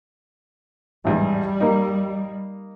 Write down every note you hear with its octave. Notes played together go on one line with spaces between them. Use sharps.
A1 E2 G#2 G3
A#3 D#4